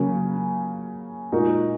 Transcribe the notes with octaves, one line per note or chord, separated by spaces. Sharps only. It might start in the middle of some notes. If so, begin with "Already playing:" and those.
Already playing: C#3 F#3 A#3 C#4
A#2 G#3 D#4 F#4 A#4